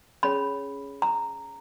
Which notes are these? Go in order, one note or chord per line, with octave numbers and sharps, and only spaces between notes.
C#4 G#4 C#5 B5
A#5